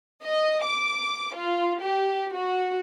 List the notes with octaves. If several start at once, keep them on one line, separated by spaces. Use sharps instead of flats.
D#5
D6
F4
G4
F#4